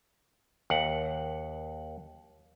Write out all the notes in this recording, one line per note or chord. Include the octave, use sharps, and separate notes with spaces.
D#2 F#5